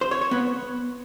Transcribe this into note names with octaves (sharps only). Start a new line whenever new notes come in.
C5
C#5
C#5
B3